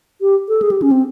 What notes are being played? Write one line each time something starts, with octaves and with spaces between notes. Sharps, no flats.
G4
A4
G#4
G4
C#4
C4